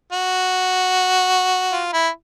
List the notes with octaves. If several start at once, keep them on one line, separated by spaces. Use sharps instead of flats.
F#4
F4
E4